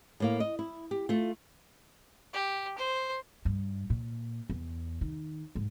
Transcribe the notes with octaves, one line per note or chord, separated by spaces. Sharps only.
A2 A#3 F5
D#5
E4
G4
A3 F4
G4
C5
G2
A#2
E2
D#3
G#2